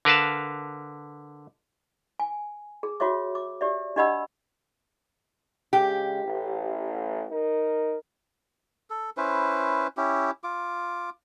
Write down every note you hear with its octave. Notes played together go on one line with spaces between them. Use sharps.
D3 A#4 B4 F5 A5
G#5
G#4
F4 F#4 C#5 E5 D6
D6
G4 D5 E5
D4 G4 D#5 F#5 B5 E6
C#3 G#3 G4
A1
D#4 A#4
A4
C#4 E4 B4 C5
C#4 E4 G4
F4 D6